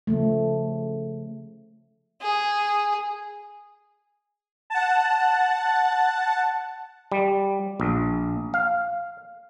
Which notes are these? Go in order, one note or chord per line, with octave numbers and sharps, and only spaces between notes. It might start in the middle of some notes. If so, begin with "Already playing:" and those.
C#3 F3 A3
G#4
F#5 A5
G3
A#1
F5